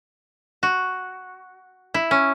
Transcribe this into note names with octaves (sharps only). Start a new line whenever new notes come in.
F#4
E4
C#4